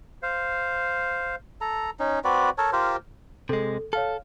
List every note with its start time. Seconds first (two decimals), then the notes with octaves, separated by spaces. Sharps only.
0.23 C5 F5
1.61 A4 A#5
1.99 C#4 D#4
2.24 C4 F#4 B4 D5
2.58 A4 A#4 C#5 A5
2.73 F4 G4 A#4 C5
3.49 C3 G#3 A4
3.93 A4 C#5 F5 F6